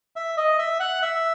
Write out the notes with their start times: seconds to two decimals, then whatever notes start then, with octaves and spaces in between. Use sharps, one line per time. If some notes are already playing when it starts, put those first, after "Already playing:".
0.16 E5
0.37 D#5
0.59 E5
0.80 F#5
1.02 E5